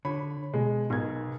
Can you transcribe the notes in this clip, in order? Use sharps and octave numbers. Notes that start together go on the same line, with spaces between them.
D3 C#5 B5
B2 G#3
B1 A#4 G#6